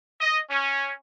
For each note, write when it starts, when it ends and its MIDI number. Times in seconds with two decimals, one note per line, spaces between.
0.21 0.40 75
0.50 0.94 61